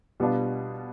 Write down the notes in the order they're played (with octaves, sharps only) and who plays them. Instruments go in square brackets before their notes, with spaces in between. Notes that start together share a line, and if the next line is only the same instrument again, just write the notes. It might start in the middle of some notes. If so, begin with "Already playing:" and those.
[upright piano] B2 G3 B3 D4 F4